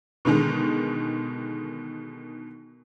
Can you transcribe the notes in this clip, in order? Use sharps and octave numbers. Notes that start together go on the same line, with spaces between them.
B2 D3 D#3 G#3